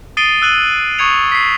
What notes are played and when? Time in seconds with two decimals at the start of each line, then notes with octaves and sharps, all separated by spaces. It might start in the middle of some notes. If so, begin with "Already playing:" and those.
0.17 D#6 A6 C7 D7 D#7 G7
0.42 E6 F#6 D#7 F#7
0.99 C#6 D#6 G#6 C#7 F7
1.32 B6 C7